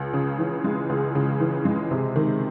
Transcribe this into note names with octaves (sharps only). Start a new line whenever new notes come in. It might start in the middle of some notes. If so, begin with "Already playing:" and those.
Already playing: C#2
C#3
E3
G#3
C#2
C#3
E3
G#3
C3
D#3